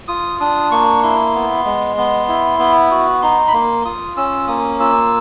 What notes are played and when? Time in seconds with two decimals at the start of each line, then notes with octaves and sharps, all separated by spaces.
0.08 F4 D#6
0.40 D4 D#6
0.71 A#3 C#6
1.03 E4 C6
1.35 B3
1.65 G#3
1.97 B3
2.28 E4
2.59 B3
2.91 F#4
3.22 D#4 C6
3.48 B5
3.53 A#3 C6
3.85 F4 D#6
4.17 C#4 E6
4.47 A#3 D#6
4.80 F4 E6